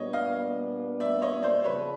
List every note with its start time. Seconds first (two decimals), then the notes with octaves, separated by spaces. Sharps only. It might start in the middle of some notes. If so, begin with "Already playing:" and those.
Already playing: A#2 G3 B3 D4 C#5 D#5
0.13 D#5 F5
1.00 D5 E5
1.22 C#5 D#5
1.43 C5 D5
1.64 C#3 F3 B4 C#5